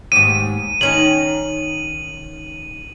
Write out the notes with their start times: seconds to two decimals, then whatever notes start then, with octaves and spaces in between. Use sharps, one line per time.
0.12 D#2 G#2 D#7
0.81 D#3 C#4 D#4 F#7